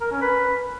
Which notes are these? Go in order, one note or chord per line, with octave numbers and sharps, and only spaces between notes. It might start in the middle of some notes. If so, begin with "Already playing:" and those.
A#4
C#4
B4